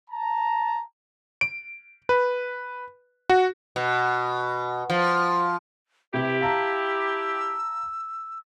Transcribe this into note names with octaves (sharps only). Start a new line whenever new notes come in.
A5 A#5
D7
B4
F#4
B2
F3
C3 E4 G4 B4
F5 A5 A#5 E6